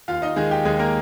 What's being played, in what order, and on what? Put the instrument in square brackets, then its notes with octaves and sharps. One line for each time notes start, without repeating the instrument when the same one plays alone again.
[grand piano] D#2 F4 F5
D#4 D#5
D#3 G#3 G#4
G4
D#2 G#3 G#4
A#3 A#4